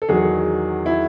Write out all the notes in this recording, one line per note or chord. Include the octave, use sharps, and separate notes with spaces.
A4
E2 D#3 F#3 G#4
E4